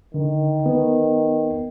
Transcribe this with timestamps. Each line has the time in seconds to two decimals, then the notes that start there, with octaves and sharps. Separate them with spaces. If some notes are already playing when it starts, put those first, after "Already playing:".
0.14 D3 D#3
0.66 B3